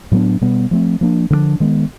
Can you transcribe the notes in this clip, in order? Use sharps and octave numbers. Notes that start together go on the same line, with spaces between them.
A2 F#3 B3 D4
B2 G3 B3
F3 A3 C4
F3 A#3 D4
D3 F3 A#3 D4
D#3 G#3 B3